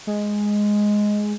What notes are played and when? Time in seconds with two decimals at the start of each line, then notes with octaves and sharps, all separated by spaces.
0.07 G#3